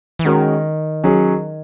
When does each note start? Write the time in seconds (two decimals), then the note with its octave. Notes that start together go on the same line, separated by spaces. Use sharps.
0.19 E3
0.25 D#3 G#3 C#4 F#4 A#4
1.04 F#3 C#4 G#4